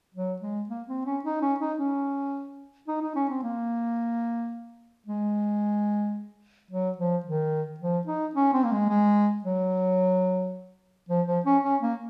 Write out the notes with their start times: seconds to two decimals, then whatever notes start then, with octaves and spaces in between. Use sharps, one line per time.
0.15 F#3
0.42 G#3
0.69 A#3
0.88 C4
1.06 C#4
1.24 D#4
1.42 C#4
1.60 D#4
1.78 C#4
2.87 D#4
3.02 D#4
3.16 C#4
3.29 C4
3.43 A#3
5.06 G#3
6.71 F#3
6.98 F3
7.25 D#3
7.80 F3
8.07 D#4
8.35 C#4
8.53 C4
8.64 A#3
8.72 G#3
8.89 G#3
9.44 F#3
11.09 F3
11.27 F3
11.45 C#4
11.63 C#4
11.82 A#3